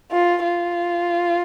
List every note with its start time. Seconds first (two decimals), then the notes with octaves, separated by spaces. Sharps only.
0.12 F4
0.44 F4